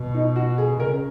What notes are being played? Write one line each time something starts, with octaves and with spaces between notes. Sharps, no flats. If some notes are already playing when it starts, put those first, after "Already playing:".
Already playing: B2
D#4
F#4
G#4
C#3 A#4